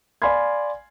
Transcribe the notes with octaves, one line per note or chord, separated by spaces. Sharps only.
D5 F5 G#5 B5 C6 G#6